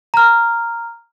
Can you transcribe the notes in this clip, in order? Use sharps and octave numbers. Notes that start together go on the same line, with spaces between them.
A#5 F6